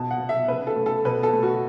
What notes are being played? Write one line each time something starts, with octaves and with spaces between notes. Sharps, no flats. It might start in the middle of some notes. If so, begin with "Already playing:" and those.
Already playing: B2 A5
F#5
B3
E5
C#3 B4
A4
A3
A4
B2 B4
A4
A3
F#4